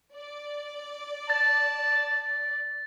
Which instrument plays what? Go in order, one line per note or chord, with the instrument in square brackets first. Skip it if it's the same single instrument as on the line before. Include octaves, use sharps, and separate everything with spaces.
[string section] D5
[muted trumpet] A5 [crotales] A6